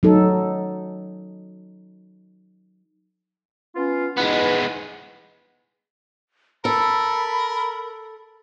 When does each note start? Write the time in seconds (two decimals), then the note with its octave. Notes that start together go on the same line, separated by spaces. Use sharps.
0.03 F#3 D#4 A4
3.76 B3 C#4 F4
4.17 G#3 B3 D#4 E4 B4
6.65 A4 A#4 B5